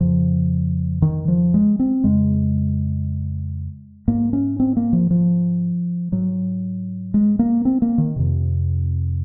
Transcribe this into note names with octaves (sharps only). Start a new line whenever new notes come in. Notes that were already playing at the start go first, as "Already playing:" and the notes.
F2 C#3 F3
D#3
F3
G#3
C4
F2 C#3 G#3
G#2 A#3
C#4
C4
A#3
F3
F3
G#2 F#3
G#3
A#3
C4
A#3
D#3
F2 C3